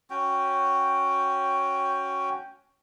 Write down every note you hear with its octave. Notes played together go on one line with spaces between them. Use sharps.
C#4 F#4 G5